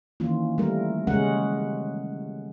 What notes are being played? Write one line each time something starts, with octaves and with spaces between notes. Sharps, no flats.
D#3 E3 A#3 C#4 F4
G3 A3 A#4
C#3 G3 G#3 C#4 A#4 F#5